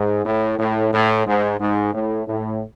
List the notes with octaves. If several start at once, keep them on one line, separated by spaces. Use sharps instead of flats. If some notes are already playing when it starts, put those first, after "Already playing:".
Already playing: G#2
A2
A2
A2
G#2
G#2
A2
A2